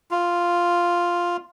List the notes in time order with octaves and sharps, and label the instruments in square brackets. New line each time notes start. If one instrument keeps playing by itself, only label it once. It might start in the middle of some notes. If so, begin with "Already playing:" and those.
[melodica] F4